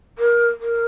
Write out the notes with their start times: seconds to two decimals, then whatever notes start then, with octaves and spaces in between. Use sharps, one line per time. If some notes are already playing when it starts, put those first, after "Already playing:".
0.19 A#4
0.60 A#4